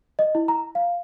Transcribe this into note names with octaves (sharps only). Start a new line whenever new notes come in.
D#5
E4
A#5
F5